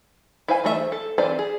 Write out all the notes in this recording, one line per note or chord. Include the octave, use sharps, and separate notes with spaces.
E4 B4 C5 F5 G#5
E3 A3 G#4 E5
C5
A4
E3 C4 C5 D5
G#4